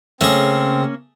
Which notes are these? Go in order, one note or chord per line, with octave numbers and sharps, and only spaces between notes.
C#3 A3 A#3 C4 C#4 G#4